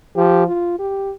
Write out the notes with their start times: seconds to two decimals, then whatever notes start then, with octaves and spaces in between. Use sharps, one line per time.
0.16 F3 G4
0.47 F4
0.79 G4